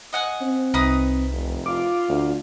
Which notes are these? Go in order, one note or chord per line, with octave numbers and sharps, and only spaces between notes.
D#5 F#5 G#5
C4
C2 D#4 B4 D#6
F1
F4 D6
D2